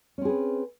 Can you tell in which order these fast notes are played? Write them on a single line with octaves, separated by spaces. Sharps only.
C#4 C4 G#4 B4